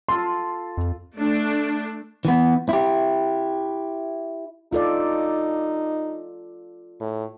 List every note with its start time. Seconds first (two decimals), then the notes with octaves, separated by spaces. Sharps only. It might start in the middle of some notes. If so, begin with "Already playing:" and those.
0.08 F4 A4 C6
0.77 F2
1.15 A3 D4
2.25 E3 B3
2.69 E4 G4
4.73 D#4 F4 A4 D5
7.00 A2